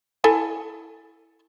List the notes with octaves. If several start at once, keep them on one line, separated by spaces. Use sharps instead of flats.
E4 A4 G#5